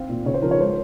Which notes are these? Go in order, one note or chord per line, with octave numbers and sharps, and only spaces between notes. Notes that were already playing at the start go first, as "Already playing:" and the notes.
Already playing: C4 F5
A#2
C#3 C#5
C5
F3 A#4
C#5
G#3 C5